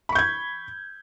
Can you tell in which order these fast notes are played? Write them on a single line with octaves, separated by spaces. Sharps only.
B5 C#6 G6 G#6